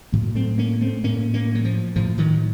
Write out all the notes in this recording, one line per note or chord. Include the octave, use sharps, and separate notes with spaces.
A2 F#3 A#3
A3 C4
A#3 C#4
A3 C4
A2 A#3 C#4
A#3 C#4
F#3
F3
A2 F3
D#3 F#3